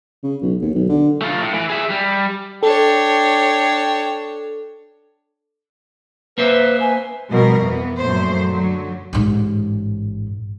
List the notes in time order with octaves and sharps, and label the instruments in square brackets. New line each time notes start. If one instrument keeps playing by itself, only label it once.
[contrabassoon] C#3
B1
D#2
B1
D3
[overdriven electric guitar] A3 F4
A2
E3
G#4 E5
G3
[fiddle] D4 C#5 [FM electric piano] A4 [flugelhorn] G5
[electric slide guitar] A#3 C5 E5 [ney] B4
[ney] G#5
[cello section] B2 F3 G3 A#4
F2 E3 B3
F#2 A#2 A3 C5
D3 F#3
[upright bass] A1 G#2